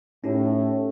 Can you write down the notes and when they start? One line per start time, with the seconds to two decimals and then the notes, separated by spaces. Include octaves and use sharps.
0.24 A2 C#4 D#4 G4